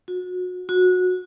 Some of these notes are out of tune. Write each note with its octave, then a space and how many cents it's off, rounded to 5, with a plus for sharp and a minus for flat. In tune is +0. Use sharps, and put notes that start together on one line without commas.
F#4 -30
F#4 -20